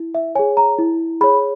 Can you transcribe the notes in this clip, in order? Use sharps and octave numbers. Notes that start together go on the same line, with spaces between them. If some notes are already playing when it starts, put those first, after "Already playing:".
Already playing: E4
E5
G#4 C#5 G#5
A#5
E4
G#4 C#5 B5